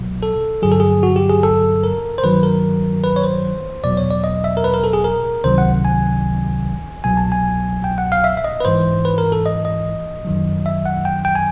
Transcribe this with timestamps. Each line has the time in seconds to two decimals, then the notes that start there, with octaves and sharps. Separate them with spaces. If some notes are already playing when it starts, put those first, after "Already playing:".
Already playing: C2 B2 F#3
0.23 A4
0.62 G2 D3 F#3 G#4
0.72 A4
0.80 G#4
1.03 F#4
1.16 G4
1.30 G#4
1.43 A4
1.83 A#4
2.18 C5
2.23 G2 D#3 F#3 B4
2.43 A#4
3.04 B4
3.16 C#5
3.23 C5
3.83 E2 B2 F#3 D5
3.97 C#5
4.11 D5
4.24 D#5
4.44 E5
4.57 A#4
4.64 B4
4.74 A#4
4.84 A4
4.93 G#4
5.04 A#4
5.44 C#2 C3 D#3 F#3 C5
5.58 F#5
5.85 G#5
7.04 C2 B2 F#3 G#5
7.17 A5
7.32 G#5
7.84 G5
7.98 F#5
8.12 F5
8.24 E5
8.37 E5
8.44 D#5
8.60 B4
8.65 G#2 E3 C5
9.05 B4
9.18 A#4
9.32 A4
9.46 D#5
9.65 D#5
10.25 F#2 D#3 F#3
10.66 E5
10.86 F#5
11.05 G5
11.25 G5
11.35 G#5